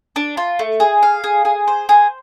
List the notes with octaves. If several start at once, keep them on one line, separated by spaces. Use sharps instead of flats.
D4
F4
A3
G#4
F5
G#4
G#4
C5
G#4